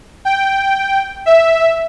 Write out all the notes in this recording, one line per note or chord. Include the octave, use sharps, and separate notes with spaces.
G5
E5